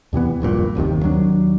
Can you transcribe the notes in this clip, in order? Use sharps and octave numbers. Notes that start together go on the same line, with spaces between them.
E2 C3 E3 B3
D#1 A#1 G2 A#2
F#1 D#2 C3 D#3
D#2 F#3 D4